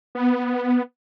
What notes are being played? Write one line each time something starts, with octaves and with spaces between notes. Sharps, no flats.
B3